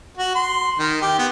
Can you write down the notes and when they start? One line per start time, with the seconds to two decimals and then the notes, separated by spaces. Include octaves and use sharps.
0.17 F#4
0.35 C6
0.79 D#3
1.01 G4
1.19 B3